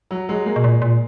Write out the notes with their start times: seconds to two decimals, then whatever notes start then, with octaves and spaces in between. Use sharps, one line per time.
0.11 F#3
0.29 F#3 G#3
0.46 G#3 A#3
0.56 B2
0.64 A#2
0.82 A#2